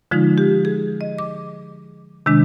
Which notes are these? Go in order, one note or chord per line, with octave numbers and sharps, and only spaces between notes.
D3 F3 G#3 D#4 F4
G4
G#4
D#5
D6
C3 D#3 G#3 D4